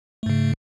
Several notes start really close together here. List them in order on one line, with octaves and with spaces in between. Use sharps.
A3 G#2 C#3